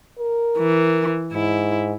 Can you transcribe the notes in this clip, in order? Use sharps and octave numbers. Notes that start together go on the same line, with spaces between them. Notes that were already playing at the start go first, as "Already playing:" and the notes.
A#4
E3
G#2 E4